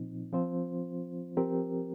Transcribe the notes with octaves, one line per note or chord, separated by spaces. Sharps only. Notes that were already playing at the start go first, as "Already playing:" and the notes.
Already playing: A#2 F3 C4 D#4
F3 C4 F4 C5
F3 C4 G4 A#4